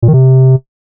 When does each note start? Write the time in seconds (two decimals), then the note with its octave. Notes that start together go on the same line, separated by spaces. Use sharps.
0.02 A#2
0.08 D#3
0.13 C3